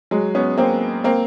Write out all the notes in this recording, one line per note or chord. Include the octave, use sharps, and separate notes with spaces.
F#3 G#3
B3 C#4
A#3 C4
A#3 C4